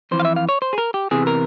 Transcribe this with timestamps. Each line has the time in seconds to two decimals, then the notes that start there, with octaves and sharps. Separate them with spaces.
0.11 F2 E3 C5
0.20 F5
0.25 E5
0.36 F5
0.49 C#5
0.62 C5
0.73 G#4
0.78 A#4
0.94 G4
1.11 E2 C3 E3 G#4
1.27 A#4